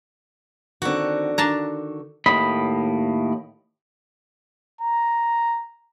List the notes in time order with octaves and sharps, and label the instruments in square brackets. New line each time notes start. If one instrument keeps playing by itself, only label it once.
[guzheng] D3 F#4 [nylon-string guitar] D#3 C4
[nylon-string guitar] D#3 [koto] D4 A5 A#5
[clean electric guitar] D#2 A2 D#5 B5
[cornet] A#5